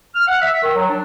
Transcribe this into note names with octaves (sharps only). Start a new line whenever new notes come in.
F6
F#5
E5
D#3
F#3
D4